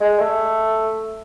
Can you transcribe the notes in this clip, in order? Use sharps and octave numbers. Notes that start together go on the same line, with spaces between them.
G#3
A3